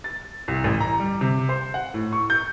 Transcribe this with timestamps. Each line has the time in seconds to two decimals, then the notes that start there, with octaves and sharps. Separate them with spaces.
0.04 A6
0.48 C2
0.64 A1
0.80 A#5
1.00 G3
1.21 C3
1.49 C5
1.74 F#5
1.94 A2
2.13 C#6
2.30 G6